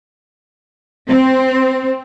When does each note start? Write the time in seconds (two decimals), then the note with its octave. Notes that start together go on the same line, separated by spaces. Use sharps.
1.07 C4